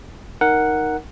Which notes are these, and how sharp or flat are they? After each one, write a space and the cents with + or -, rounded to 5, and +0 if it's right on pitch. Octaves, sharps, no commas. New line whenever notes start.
D#4 +0 A#4 +0 F#5 +0